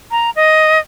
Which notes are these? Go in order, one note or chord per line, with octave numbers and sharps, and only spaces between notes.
A#5
D#5